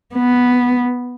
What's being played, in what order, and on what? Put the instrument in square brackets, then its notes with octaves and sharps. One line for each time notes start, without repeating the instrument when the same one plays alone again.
[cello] B3